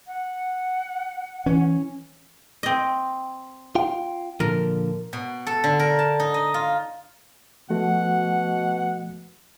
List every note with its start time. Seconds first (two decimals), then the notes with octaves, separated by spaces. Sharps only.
0.07 F#5
1.46 E3 C#4
2.63 C4 D#5
3.75 F4 F5 G5
4.40 A#2 D3 F3 A#4
5.13 B2
5.47 A4
5.64 D3
5.79 A#4
5.99 A5
6.20 D#4
6.34 D#5
6.54 F4
7.70 B2 F3 A3 F#4 F#5